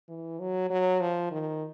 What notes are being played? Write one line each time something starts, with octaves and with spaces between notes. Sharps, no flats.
E3
F#3
F#3
F3
D#3